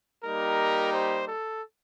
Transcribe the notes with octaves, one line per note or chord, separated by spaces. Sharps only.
G3 A#3 D#4 G4 A#4
C5
A4